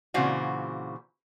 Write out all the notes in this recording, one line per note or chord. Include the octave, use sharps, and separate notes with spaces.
A#2 C#3 E3 C4 F#4